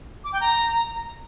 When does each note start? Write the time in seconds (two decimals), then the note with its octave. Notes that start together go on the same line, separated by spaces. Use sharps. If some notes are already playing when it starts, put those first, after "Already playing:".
0.24 D6
0.32 G5
0.41 A#5